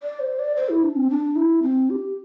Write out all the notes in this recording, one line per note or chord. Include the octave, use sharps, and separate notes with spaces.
D5
C5
D5
C5
E4
D4
C4
D4
E4
C4
G4